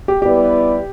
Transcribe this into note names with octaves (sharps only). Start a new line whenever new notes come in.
G4
G3 B3 E4 G4 B4 D5